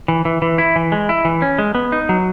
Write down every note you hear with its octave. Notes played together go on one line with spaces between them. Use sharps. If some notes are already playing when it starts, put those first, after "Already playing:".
E3
E3
E3
E4
E3
G#3
E4
E3
C#4
G#3
B3
D#4
F#3